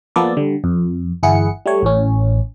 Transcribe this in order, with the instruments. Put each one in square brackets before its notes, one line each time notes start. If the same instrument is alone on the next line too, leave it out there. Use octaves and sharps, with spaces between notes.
[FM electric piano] F3 A#3 B3 A4 D5
D3 G3
F2
G1 E3 E4 G#4 F#5 C#7
G3 A3 C#5
A1 A2 C#4